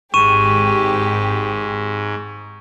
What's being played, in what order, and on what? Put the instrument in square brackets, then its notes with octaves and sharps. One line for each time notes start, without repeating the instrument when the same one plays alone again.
[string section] G#1 G4 [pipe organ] G#2 [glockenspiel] C#6 D#7 E7